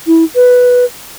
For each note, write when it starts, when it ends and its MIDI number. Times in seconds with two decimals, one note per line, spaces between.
0.07 0.24 64
0.35 0.85 71